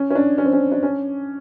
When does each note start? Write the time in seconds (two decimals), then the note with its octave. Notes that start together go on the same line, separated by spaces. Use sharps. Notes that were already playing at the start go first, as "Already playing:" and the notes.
Already playing: C#4
0.10 C#4
0.15 D4
0.38 C#4
0.45 C4
0.53 C#4
0.72 D4
0.83 C#4